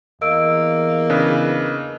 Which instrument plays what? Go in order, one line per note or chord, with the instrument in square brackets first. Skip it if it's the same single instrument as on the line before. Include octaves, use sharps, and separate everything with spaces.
[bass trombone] E2 [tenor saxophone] A#3 [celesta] D#5 E6 D7
[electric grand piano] C#3 D4 B4